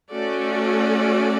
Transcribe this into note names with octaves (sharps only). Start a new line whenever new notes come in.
A3 C#4 F#4 A4 D5